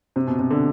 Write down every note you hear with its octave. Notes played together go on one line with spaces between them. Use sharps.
C3
B2
C3
D3